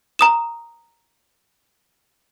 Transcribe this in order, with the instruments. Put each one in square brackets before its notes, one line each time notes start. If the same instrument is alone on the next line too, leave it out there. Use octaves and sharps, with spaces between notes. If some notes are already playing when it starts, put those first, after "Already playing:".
[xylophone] A#5 D#6 E7